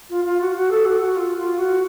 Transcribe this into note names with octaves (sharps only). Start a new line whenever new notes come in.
F4
F4
F#4
F#4
A4
F#4
F#4
F4
F4
F#4